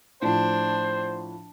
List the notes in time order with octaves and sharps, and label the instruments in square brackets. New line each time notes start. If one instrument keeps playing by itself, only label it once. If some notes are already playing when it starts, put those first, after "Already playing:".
[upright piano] A2 F3 [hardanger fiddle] D4 [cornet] C5